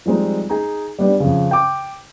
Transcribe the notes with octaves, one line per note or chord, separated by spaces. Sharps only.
F3 G3 G#3 C4 D#4
D#4 G#4
G3 B3 D4 G4
F2 C#3
G5 D6